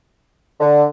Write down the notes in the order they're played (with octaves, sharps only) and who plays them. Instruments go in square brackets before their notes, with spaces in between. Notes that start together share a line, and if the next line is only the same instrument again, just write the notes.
[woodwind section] D3